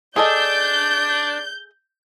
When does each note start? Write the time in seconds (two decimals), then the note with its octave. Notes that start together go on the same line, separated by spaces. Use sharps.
0.16 D4 G#4 A4 D5 D#5 G6